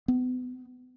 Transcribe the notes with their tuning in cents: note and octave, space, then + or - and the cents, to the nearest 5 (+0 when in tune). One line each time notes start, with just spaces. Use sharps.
B3 +35